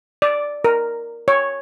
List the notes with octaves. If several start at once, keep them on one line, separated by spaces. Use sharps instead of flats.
D5
A#4
C#5